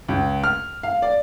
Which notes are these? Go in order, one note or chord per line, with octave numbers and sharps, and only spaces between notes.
C#2
F6
F5
D5